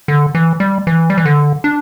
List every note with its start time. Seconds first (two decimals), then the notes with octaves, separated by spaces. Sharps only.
0.08 D3
0.35 E3
0.60 G3
0.87 E3
1.10 G3
1.18 E3
1.25 D3
1.64 D4